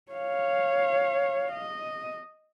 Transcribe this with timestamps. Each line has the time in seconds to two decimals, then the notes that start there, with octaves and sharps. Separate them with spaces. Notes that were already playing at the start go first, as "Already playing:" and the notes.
0.12 C#5 F5
1.52 D#5